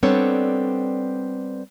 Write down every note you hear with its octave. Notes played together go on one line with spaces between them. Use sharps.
G3 B3 C4 D4 A4 C#5